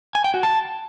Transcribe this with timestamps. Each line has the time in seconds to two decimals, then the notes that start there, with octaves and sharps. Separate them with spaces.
0.15 G#5
0.24 G5
0.34 F#4
0.43 A5